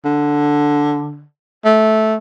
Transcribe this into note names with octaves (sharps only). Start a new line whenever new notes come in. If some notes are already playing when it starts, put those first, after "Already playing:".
D3
A3